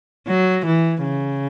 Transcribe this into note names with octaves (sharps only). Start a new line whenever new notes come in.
F#3
E3
C#3